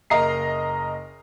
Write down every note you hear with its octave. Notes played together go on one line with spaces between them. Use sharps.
F#1 A#4 D#5 A#5 C7